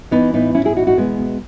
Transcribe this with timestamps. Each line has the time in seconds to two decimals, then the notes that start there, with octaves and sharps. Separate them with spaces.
0.11 E3 B3 D#4
0.33 A2 B3 D#4
0.54 A2 C#4 E4
0.65 E4 G#4
0.76 E3 D#4 F#4
0.87 D#4 F#4
0.97 B2 G#3 B3
1.19 B2